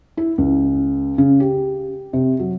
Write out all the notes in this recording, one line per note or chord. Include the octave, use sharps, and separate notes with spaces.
E4
C#2
C#3
G4
C3
F#3